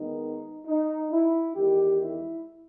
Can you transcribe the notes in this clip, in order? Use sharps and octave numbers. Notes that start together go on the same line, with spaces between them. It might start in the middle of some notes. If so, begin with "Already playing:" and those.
Already playing: D#2 D#3 G#3 B3 D#4
D#4
E4
E2 D#3 G#3 G4
E4